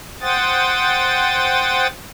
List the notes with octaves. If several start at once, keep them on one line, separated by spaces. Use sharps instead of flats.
C5 F#5 G5 D#6 A6